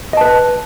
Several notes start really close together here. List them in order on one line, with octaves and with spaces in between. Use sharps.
D#5 A5 B4